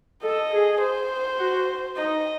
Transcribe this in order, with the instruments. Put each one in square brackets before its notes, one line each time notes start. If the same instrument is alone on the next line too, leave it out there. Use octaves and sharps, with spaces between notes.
[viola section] A4 [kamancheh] D#5
[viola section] G#4
[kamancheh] C5
[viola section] F#4
[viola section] D#4 [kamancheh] D#5